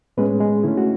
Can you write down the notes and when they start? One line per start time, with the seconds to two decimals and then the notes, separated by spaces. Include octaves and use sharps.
0.17 A2 G#3 B3 C#4 B4
0.40 G#3 G#4
0.64 D3 A3 C#4 E4
0.77 F#4